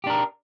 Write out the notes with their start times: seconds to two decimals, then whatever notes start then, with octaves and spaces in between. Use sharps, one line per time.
0.04 G4
0.07 D4
0.10 A#4